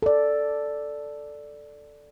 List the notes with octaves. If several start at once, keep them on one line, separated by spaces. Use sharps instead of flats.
A4 D5